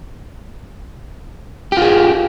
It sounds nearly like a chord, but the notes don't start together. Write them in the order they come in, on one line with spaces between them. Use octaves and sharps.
G4 F4 G#4